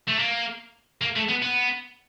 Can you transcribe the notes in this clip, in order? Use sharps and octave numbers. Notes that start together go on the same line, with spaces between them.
A3
A#3
A#3
A3
B3
B3